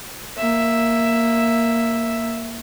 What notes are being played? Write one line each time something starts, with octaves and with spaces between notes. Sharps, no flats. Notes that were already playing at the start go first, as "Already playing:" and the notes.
A#3 E5